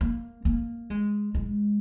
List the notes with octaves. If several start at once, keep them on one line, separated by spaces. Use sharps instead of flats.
A#3
A#3
G#3
G#3